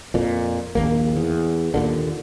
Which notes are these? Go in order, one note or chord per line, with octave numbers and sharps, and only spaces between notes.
F2 A#2
A#1 D#2 A#3
E2
D#2 A#2 D3